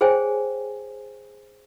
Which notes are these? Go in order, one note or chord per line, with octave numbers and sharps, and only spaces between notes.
G#4 C5 C#5 G5 G#5